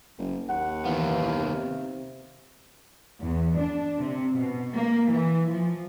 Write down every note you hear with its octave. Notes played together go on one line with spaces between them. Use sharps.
F#1
D#2 F#5
D#3 E3 B3 F5
C3
E2
D4
C3
B2
A#3
E3
F3